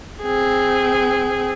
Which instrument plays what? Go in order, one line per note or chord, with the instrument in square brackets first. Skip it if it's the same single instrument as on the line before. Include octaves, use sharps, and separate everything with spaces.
[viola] C4 G#4